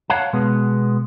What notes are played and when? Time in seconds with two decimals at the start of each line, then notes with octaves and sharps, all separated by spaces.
0.10 C#5 F5 F#5 A5
0.33 B2 G#3 B3